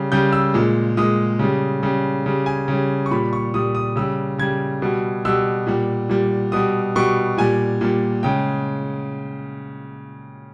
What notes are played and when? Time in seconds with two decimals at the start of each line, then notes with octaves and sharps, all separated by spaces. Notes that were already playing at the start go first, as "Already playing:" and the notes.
Already playing: C#3 G3
0.12 C#3 G3 G6
0.33 E6
0.54 A#2 G#3
0.97 A#2 G#3 D#6
1.39 C#3 G3
1.83 C#3 G3
2.26 C#3 G3
2.46 G#5
2.68 C#3
2.73 G3
3.06 C#6
3.11 A#2 G3 B5
3.33 C#6
3.54 A#2 G3 D#6
3.75 D#6
3.96 C#3 G3 E6
4.38 C#3 G3 G#6
4.82 B2 G3
5.25 B2 G3 E6
5.67 A#2 G3
6.09 A#2 G3
6.52 B2 G3 D#6
6.96 B2 G3 C#6
7.37 A#2 G3 G#5
7.81 A#2 G3
8.23 C#3 G#3 G5